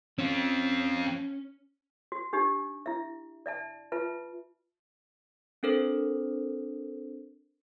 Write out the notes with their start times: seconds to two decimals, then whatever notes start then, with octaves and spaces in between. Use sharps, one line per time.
0.19 C4 C#4 F4
2.12 F#4
2.33 D4 D#4 G4
2.86 E4 E5
3.46 D5 E5 A5
3.92 F4 B4 E5 A5
5.63 C4 D4 A4 A#4 C5